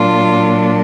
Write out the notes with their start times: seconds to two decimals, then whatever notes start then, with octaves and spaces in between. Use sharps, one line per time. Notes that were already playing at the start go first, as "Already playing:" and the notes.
Already playing: A#2 F#3 A#3 D4 F4